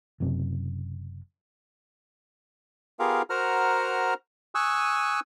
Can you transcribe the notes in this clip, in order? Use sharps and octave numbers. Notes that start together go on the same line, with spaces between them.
F#1 F#2 C3
B3 F4 G4 G#4 A#4 F5
F#4 A#4 C5 F#5 A#5 F6
G#5 C#6 D#6 E6 F#6